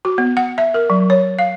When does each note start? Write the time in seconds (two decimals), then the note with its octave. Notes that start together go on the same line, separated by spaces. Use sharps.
0.05 F#4
0.18 B3
0.37 F#5
0.58 E5
0.74 A#4
0.90 F#3
1.10 C#5
1.39 F5